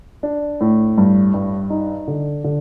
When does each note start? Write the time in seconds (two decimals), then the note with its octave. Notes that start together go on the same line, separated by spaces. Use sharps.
0.23 D4
0.61 A2
0.98 G2
1.34 G2
1.70 D#4
2.08 D3
2.44 D3